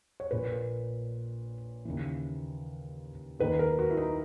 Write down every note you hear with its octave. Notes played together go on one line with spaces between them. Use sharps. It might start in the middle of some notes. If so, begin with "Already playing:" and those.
C#5
A#1 A#2 B4
D#2 C#3 E3
D#2 D#3 B4
A#4
F#4
E4
D#4